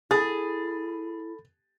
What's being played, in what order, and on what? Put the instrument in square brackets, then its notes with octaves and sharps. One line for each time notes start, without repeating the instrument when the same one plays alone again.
[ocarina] E4 [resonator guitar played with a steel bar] G#4 [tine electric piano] A4 B5 [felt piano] A6